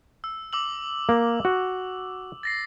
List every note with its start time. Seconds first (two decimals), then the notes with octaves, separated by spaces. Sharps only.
0.24 E6
0.53 D6 E6 F#7
1.09 A#3
1.45 F#4
2.43 A6 A#6 C7